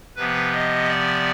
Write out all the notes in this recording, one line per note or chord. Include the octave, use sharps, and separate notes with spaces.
C3 F3 B3 B4
D#5
D5